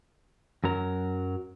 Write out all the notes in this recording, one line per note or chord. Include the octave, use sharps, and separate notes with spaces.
F#2 F#3 A#4